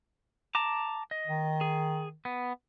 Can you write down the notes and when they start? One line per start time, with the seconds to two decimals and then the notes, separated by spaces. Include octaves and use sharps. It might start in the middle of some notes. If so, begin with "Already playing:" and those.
0.55 A5 A#5 D6
1.11 D#5
1.27 D#3
1.61 G#4
2.25 B3